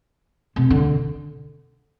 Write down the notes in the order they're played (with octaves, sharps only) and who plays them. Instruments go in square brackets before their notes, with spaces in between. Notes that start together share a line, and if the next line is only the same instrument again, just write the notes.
[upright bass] C3
D3